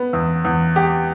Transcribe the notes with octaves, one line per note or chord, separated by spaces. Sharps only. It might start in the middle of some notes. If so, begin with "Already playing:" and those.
Already playing: B3
E2
E2
G4